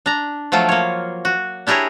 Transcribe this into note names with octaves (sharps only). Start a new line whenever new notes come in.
D4 A#5
F3 F#3 A3 F4
A#3 C#5
F#4
D4 E4 G4 G#4 A#4 C#5